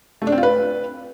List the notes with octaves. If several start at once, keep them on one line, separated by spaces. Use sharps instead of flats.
A3
D4
C4
F4
B4